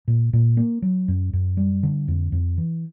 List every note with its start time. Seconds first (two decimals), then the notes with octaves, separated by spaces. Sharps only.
0.08 A#2
0.33 A#2
0.57 A#3
0.82 F#3
1.08 F#2
1.33 F#2
1.57 G3
1.83 D3
2.08 F2
2.32 F2
2.58 E3